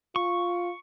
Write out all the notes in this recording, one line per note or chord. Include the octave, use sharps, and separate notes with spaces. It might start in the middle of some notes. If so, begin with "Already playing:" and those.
F4 C#6